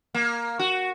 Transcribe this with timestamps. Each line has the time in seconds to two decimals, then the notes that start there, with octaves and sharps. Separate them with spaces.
0.15 A#3
0.59 F#4